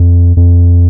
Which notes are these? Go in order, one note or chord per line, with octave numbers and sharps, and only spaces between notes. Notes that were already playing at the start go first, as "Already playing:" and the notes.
Already playing: F2
F2